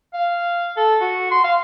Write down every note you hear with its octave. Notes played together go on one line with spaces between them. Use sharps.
F5
A4
F#4
C6
F5